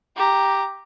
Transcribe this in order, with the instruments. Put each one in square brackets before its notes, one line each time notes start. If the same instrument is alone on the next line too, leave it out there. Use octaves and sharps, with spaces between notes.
[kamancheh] G4 A#5